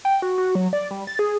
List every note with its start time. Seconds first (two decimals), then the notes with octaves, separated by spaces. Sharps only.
0.05 G5
0.22 F#4
0.38 F#4
0.55 F#3
0.73 D5
0.91 G3
1.07 A6
1.19 G#4